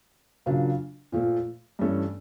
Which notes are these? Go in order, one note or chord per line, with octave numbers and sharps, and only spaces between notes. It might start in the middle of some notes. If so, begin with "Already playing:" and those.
C#3 F#3 A#3 D4 F4
A#2 F3 A3
G2 E3 A3 C#4